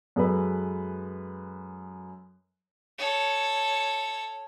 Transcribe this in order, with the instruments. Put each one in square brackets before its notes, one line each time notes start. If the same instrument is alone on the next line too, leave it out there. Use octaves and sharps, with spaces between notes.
[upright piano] F#2 G#3 G#4 A4 B4
[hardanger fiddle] A4 C#5